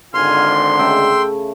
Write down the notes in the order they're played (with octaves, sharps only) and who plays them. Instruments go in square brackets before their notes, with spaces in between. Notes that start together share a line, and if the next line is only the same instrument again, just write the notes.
[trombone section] G#1 G#2 D3 [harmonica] F4 G#5 F6 [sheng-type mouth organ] C6
[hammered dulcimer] C#3 A3 B5 [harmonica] G5 E6